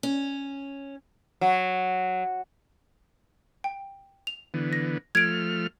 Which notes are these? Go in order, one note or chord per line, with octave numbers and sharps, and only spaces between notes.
C#4
F#3
G5
F7
D3 E3 B3
A#6
F3 A3 F6 G#6 D7